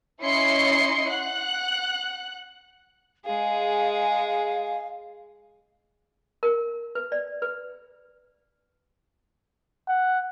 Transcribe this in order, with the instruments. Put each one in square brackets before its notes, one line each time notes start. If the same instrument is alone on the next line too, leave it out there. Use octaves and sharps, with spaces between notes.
[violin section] C#4 E4 D#5 C6 C7 C#7
F#5 F#6
[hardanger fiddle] G#3 G#4 [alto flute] F5
[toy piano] A#4
B4
D5
B4
[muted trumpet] F#5